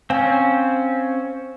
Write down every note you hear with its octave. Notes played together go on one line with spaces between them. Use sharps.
C4 C#4 F5 G#5